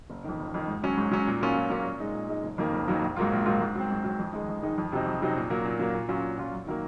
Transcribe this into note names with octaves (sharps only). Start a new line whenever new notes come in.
F#1
F2 D#3
F#1
F2 D#3
G#2
F#3 C#4
G#2
F#3 C#4
A#2
F#3 A#3 C#4 F4
A#2
F#3 A#3 C#4 F4
A#2
G#3 D#4
A#2
G#3 D#4
F#1
F2 D#3 F#3 A#3
F#1
F2 D#3 F#3 A#3
A#1
G#2 F#3 A#3 F4
A#1
G#2 F#3 A#3 F4
G#2
F#3 C4
G#2
F#3 C4
F2
D#3 G#3 D#4
F2
D#3 G#3 D#4
F2
C3 F#3 C4 D#4
F2
C3 F#3 C4 D#4
A#2
F#3 A#3
A#2
F#3 A#3
A#2
F#3 C#4 F4
A#2
F#3 C#4 F4
F#2
D#3 F#3 A#3